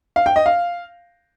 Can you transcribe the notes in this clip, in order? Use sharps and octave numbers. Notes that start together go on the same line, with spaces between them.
F5
G5
D#5
F5